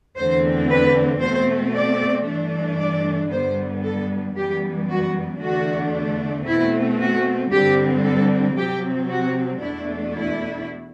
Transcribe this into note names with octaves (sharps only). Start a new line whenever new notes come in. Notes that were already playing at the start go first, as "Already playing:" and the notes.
E2 D3 A3 C4 C5
B4
B2 A3 C4 C5
D5
G2 E3 A3 D4
D5
G2 D3 G3 B3 C5
A4
F#2 E3 G3 B3 G4
F#4
E2 D3 A3 D4 F#4
B2 A3 C4 E4
F#4
G2 D3 G3 C4 G4
A4
C3 F#3 C4 G4
F#4
E2 B2 A3 D4 E4
E4